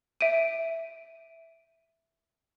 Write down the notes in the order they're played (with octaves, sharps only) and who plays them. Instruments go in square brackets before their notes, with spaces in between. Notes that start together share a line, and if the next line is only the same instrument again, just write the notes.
[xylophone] E5 D7 D#7